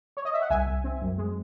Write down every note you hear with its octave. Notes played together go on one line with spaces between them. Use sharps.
C#5
D#5
E5
F#5
C2 E5 G#5
C2
C4
F#2
G#3